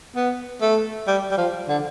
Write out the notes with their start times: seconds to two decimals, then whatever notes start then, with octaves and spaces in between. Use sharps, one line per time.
0.16 B3
0.61 A3
1.07 G3
1.31 G3
1.38 F3
1.69 D3